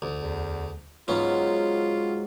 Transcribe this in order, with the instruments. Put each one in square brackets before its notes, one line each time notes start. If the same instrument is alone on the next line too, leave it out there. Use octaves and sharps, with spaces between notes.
[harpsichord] D2
[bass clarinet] E2
[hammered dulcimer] G#2 F#3 [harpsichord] B3 C#4 [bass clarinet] F4